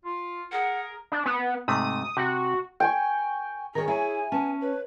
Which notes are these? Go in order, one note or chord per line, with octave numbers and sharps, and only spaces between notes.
F4
G#4 A#4 F#5
D4
B3
G#2 C3 A3 D#6
C3 F#4 F#5
G5 G#5 C#6
D#3 G#4 A#4 C#5
E4 C#5 G#5
B3 C#4 A5
B4 C#5